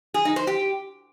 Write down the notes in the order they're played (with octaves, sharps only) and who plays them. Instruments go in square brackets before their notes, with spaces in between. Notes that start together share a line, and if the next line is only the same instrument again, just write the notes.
[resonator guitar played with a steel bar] G#4
D#4
C5
G4